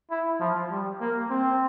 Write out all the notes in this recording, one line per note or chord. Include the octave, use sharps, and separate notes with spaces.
E4
F3
G3
A#3
C4